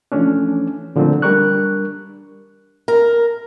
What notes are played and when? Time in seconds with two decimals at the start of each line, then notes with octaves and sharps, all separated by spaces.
0.12 E3 F3 A3 C#4 D4
0.96 A#2 D3 F3 F#3 A3 C4
1.22 G3 D4 A#4 C#6 F#6
2.88 A#4